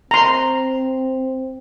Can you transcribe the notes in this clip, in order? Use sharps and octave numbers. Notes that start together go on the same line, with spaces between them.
C4 A#5 C6